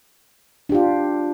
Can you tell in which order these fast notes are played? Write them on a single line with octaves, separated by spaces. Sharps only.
D4 G4 F4